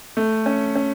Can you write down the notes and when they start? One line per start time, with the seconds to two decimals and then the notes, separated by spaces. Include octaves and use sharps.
0.17 A3
0.46 C#4
0.75 C#4